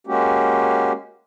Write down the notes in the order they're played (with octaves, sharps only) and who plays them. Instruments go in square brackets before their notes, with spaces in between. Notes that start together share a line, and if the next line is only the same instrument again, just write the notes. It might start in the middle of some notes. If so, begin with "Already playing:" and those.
[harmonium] G#3 A#3 C#4 F#4 G4